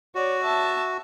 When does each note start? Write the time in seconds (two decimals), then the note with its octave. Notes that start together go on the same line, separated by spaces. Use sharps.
0.15 F#4 C#5 D5
0.43 E5 A5